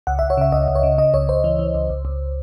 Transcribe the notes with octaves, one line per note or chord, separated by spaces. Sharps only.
C#2 F#5
C#2 E5
C#5
C#3 E5
C#2 D#5
C#2
C#5
C#3
C#3 D#5
C#2 C#5
C#2 C5
E3
E3
C#2
C#2
C#2